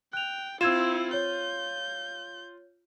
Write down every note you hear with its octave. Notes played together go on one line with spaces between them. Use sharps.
G5 F#6 F7
C4 E4 F4 E6 G#6 E7
C#5 G6